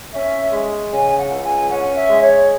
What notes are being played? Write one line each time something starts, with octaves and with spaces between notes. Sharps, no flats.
C#4 E5
G#3
C#3 G#5
F#5
C#2
G#5
C#4 F#5
E5
G#3
C#5